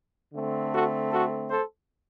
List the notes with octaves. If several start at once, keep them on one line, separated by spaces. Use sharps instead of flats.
D3 A3 C4
F#4 A4
F#4 A4
A4 C5